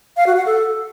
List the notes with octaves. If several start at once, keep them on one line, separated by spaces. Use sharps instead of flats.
F5
F#4
F#5
A4